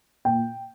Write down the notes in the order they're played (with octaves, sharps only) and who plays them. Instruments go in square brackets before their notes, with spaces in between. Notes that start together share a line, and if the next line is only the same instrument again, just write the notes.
[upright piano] A#2 G5